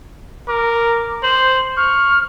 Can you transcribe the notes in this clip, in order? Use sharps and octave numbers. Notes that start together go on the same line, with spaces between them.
A#4 D6
C5 F#7
C#6 F6